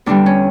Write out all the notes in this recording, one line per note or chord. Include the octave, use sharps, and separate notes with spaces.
E2 D3 G3 B3 D4
C#4